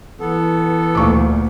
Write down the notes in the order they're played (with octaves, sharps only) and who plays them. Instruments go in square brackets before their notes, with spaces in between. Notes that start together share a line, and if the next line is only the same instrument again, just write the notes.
[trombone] E3 [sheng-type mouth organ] B3 A4
[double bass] D2 [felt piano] A#2 C#6 D6